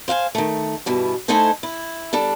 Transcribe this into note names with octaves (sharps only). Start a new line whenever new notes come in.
C5 F5 F#5 G#5
D#3 A3
G2 B2 E3
A3 D#4 E4 A4 C5 G#5
E4
G3 D4 A4